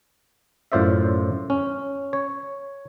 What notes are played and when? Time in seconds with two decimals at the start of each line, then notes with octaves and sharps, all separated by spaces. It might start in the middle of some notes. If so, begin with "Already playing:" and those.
0.72 F#2 A2 F4 C5 D5 E5
1.50 C#4
2.13 C#5